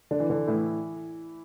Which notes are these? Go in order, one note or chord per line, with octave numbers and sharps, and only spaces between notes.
D3 D4
E3
D3 D4
A2 E3 E4